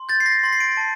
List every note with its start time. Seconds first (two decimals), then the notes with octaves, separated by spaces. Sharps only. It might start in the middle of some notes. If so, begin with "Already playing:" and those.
Already playing: C6
0.09 G6 A6
0.20 C7
0.26 A#6
0.43 C6 A#6
0.53 C7
0.60 D7
0.77 A5